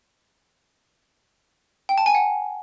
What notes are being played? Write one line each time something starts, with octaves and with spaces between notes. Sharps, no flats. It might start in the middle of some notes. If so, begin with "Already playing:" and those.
G5
A5
G#5
F#5